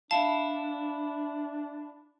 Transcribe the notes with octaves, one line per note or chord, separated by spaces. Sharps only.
D4 E4 F5 A5